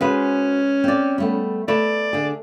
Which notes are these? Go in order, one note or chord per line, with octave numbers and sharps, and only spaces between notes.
G#3 C#4 F#4 G#4 B4 C5
C4 D5
G3 A3 B3
A3 B4 C#5 D5
D3 G#4